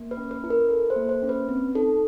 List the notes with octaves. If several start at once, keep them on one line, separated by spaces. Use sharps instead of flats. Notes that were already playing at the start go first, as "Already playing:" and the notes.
Already playing: A#3
B4
C#4
B4
E4
A#4
A4 B4
C5
A#3
C5
C#4
B4
C4
D#4 A4